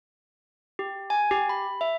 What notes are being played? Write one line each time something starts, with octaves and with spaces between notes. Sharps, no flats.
G4
G#5
G4
B5
E5